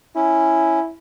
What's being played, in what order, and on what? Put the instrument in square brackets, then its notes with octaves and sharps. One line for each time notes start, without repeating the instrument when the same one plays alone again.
[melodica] C#4 [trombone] E4